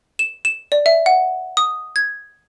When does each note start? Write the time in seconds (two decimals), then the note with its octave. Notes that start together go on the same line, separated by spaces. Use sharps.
0.19 E7
0.45 E7
0.72 D5
0.86 E5
1.06 F#5
1.57 D#6
1.96 G#6